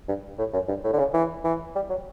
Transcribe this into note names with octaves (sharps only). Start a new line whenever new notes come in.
G2
A2
F#2
G2
A2
D3
C#3
E3
E3
G3
F#3